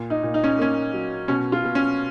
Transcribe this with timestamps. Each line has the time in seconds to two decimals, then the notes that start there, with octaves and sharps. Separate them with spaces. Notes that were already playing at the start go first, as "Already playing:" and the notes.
Already playing: A#2
0.10 D#4
0.23 A#2
0.34 D#4
0.44 C#4
0.58 A#3 C#4
0.93 F#3
1.28 B2 C#4
1.52 F4
1.64 B2
1.75 C#4